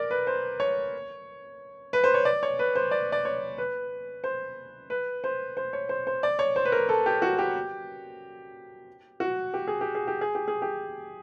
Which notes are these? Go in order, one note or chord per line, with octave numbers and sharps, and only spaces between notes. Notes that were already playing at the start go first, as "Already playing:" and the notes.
Already playing: A#4 D5
B4
C5
C#5
B4
C5
C#5
D5
C#5
B4
C5
D5
D5
C#5
B4
C5
B4
C5
C5
C#5
C5
C5
D5
C#5
C5
B4
A#4
A4
G4
F#4
G4
F#4
G4
G#4
G4
G#4
G4
G#4
G4
G#4
G4